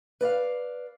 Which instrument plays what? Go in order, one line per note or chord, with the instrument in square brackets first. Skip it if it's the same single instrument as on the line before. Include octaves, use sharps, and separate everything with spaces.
[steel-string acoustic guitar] B4 D5 E5 F5